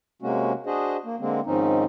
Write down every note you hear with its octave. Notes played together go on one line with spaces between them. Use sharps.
C3 G#3 A#3 C#4 F#4
D4 F#4 G#4 C5 D#5
A#3
D3 G#3 A#3 C4
G#2 D#3 F3 C4 C#4 D#4